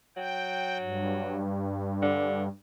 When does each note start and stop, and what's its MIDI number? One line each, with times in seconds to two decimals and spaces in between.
0.17 1.49 54
0.17 0.78 79
0.79 2.48 43
2.02 2.43 50